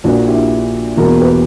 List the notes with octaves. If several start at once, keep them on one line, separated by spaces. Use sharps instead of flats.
A#1 A#2 A#3 D4 F#4
E4 G4
E1 E2 B2 A#3 F#4 A#4
G4 B4